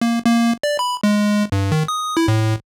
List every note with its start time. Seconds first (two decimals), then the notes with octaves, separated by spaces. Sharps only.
0.01 A#3
0.25 A#3
0.63 D5
0.79 B5
1.03 G#3
1.52 G2
1.72 D#3
1.88 D#6
2.17 E4
2.28 A2